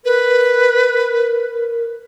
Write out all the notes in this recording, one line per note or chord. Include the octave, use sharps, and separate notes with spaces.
A#4 B4